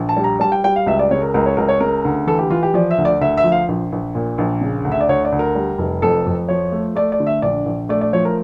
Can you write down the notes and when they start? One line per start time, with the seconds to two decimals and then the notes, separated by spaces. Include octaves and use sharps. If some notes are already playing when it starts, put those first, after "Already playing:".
Already playing: A#1
0.09 A5
0.17 G3
0.24 A#5
0.40 G3 A5
0.52 G5
0.64 G3 G5
0.76 F5
0.86 C#2 E5
0.99 D5
1.11 C#3 C#5
1.22 A#4
1.34 C#2 A#4
1.46 C#5
1.57 C#2 A#4
1.69 C#5
1.80 C#3 A#4
2.05 D2
2.27 E3 A4
2.39 G4
2.50 E3 F4
2.63 G4
2.74 F3 D5
2.91 E5
2.98 D2
3.05 D5
3.21 D2 E5
3.37 E5
3.44 F3
3.52 F5
3.68 A#1
3.92 A#1
4.15 A#2
4.38 A#1
4.61 C#3
4.85 D2
4.92 E5
5.01 D5
5.09 D2 C#5
5.25 D5
5.32 D2
5.39 A#4
5.55 G3
5.78 F1
6.02 F2 A4
6.26 F2
6.49 F3 C#5
6.72 A3
6.95 A3 D5
7.12 D5
7.20 D3
7.27 E5
7.42 A#1 D5
7.66 A#1
7.89 A3 D5
8.01 D5
8.13 F3 C#5
8.25 A#4